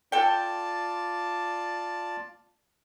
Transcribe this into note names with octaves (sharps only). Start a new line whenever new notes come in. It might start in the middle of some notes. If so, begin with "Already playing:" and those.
F4 A4 D5 G5 A5